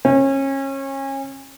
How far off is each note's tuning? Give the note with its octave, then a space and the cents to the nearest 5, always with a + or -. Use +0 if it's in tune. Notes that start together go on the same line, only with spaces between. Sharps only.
C#4 -30